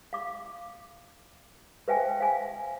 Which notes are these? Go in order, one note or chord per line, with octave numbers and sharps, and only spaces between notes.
F5 D6
B4 C5 E5 F5 G5 G#5
E5 F5 G#5